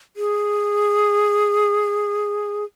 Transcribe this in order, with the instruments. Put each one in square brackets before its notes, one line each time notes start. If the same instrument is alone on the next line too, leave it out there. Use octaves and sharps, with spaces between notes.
[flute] G#4